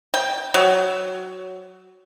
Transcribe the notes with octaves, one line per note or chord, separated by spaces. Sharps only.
G5
F#3